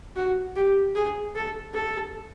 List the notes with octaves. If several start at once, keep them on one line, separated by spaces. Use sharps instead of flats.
F#4
G4
G#4
A4
A4